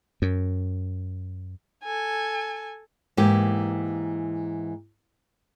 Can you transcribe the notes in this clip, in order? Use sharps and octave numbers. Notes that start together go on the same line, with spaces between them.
F#2
A4 G#5
G#2 E3 A#3 G4